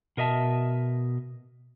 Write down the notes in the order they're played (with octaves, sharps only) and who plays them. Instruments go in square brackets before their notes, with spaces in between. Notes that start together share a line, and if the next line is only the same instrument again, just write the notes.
[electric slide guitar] B2 A#4 D#5 E5 A5